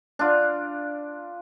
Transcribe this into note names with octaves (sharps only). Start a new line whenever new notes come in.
D4 F4